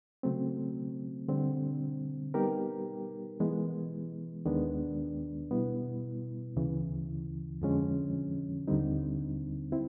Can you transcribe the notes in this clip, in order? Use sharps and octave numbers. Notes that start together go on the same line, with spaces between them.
C#3 F#3 A3 C4
D3 G3 C4
G3 B3 D#4 G4 A#4
E3 G#3 B3
D#2 D#3 G#3 B3 D4
B2 G3 B3 E4
D2 C#3 E3
F2 D3 F3 G#3 C#4
D#2 D3 G3 C4 D#4
C4 E4